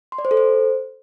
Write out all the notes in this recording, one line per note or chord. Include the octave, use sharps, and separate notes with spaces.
C6
D5
C5
A4
C5